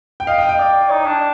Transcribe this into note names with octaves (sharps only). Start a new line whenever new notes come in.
G5
D#5 F5
G5
D#5 G5
D5
D#4
D4